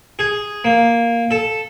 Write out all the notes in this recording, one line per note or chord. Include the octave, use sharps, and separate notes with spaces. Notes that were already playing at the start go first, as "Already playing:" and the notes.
G#4
A#3
A4